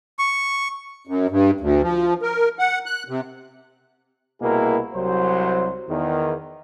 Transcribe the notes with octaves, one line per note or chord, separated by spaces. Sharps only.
C#6
F#2
G2
D2
F3
A#4
F#5
F#6
C3
C2 B2 A#3 E4 G#4 A#4
C2 F#3 C5
E2 D#3